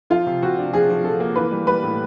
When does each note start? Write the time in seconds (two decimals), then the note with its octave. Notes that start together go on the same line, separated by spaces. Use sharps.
0.10 F3 F4
0.26 C3
0.43 C3 F#4
0.58 D4
0.73 F3 G#4
0.90 F3
1.04 F3 A4
1.20 A#3
1.36 E3 B4
1.52 G3
1.67 G3 B4
1.83 A2